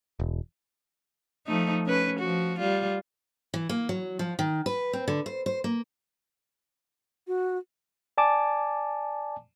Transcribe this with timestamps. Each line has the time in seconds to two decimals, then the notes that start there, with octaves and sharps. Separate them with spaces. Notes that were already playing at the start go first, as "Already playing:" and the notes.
0.20 E1
1.47 F3 A3 D#4
1.86 C#4 B4
2.20 F3 F#4
2.59 G3 F4
3.54 E3
3.69 A#3
3.89 F#3
4.19 F3
4.39 D#3
4.66 B4
4.93 C4
5.08 D3
5.26 C5
5.46 C5
5.64 A#3
7.28 F#4
8.18 D5 G#5 A5 D6